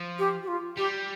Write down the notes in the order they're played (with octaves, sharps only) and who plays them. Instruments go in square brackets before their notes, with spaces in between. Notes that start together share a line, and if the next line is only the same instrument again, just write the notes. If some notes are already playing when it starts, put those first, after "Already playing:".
Already playing: [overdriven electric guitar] F3
[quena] G4
G4
F4
[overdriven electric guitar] G3 [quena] G4